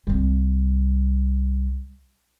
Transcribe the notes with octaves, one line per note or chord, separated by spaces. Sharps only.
C2 G3